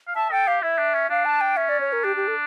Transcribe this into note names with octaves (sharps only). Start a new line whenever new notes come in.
F5
E5 A5
A4 G5
G4 F5
E4 E5
D4
C#4
D4 F5
A5
G5
C#4 E5
D5
C#5
A#4
D4 G4
G4
A4